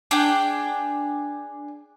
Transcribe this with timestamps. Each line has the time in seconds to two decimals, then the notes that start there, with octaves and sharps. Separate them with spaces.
0.11 D4 G#4 G5